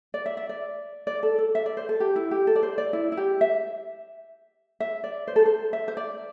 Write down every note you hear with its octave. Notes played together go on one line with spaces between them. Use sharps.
D5
E5
E5
D5
D5
A4
A4
E5
D5
C5
A4
G4
E4
G4
A4
D5
C5
D5
E4
E4
G4
E5
E5
D5
C5
A4
C5
E5
C5
D5